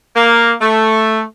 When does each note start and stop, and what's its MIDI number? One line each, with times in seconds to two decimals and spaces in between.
0.16 0.53 58
0.61 1.21 57